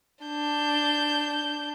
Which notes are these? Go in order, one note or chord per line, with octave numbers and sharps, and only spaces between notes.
D4 G6